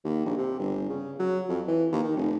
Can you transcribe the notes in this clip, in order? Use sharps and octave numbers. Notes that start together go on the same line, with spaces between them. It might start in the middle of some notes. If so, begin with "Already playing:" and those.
D#2
A#1
C3
G1
C#3
F#3
F2
E3
D#2
D#3
F1